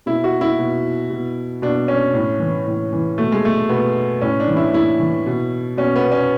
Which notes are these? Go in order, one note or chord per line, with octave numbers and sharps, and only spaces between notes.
B2 E4
F#4
E4
B2
B2
B2 D4
C#4
A2
E3
A2
E3
B2 A3
G#3
A3
B2 B3
A2 C#4
D4
E3
E4
A2 E4
E3
B2
B2 C#4
B3
C#4